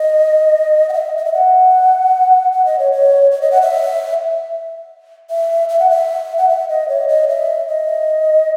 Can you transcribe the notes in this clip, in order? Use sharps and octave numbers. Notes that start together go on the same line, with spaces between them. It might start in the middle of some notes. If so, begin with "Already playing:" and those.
Already playing: D#5
F#5
E5
D#5
E5
F#5
F#5
D#5
C#5
C#5
C#5
D#5
F#5
E5
E5
E5
F#5
E5
F#5
E5
D#5
C#5
D#5
E5
D#5